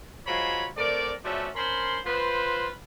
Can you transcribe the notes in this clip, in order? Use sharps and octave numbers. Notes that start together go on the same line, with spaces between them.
F#3 G#3 F4 C5 C#5 B5
A3 C4 A#4 D5
F3 A3 C#4 F#4 D5 E5
C#4 A#4 C5 B5 C6
F4 B4 C5